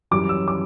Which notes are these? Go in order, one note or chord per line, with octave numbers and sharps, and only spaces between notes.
F#2 E3 G3 C#4 D6
E6
D6